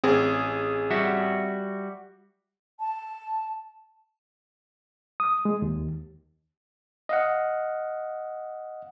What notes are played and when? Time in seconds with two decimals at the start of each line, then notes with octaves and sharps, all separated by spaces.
0.04 A1 C4 G#4
0.91 G3 F#4 E5
2.80 A5
5.20 D#6
5.45 G#3
5.62 D#2
7.09 D#5 F5 F#5